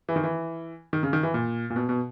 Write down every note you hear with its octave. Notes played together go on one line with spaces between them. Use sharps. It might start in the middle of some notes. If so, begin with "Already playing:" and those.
E3
D#3
E3
D#3
C#3
D#3
E3
A#2
A#2
B2
B2